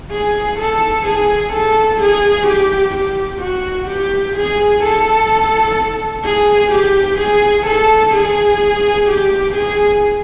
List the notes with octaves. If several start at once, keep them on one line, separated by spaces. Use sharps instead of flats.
G#4
A4
G#4
A4
G#4
G4
G4
F#4
G4
G#4
A4
G#4
G4
G#4
A4
G#4
G4
G#4